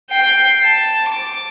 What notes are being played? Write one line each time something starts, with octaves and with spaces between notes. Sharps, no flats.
G5 C7
A5
D6